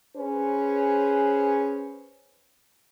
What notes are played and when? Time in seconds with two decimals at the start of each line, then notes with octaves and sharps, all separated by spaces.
0.15 C#4 G#4 B4 C5